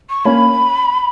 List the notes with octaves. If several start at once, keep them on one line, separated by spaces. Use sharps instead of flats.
C#6
A#3 C#4 B5